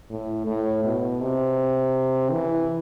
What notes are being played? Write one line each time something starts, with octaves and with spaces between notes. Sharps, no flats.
A2
A2
B2
C3
E3